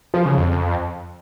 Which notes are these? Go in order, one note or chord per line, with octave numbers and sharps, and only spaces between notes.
F3
C#3
F2